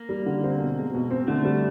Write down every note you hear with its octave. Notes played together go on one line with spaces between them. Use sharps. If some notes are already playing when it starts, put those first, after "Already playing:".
Already playing: A#3
G3
D3
C4
B2
G#3
B2
C4
D3 A3
G3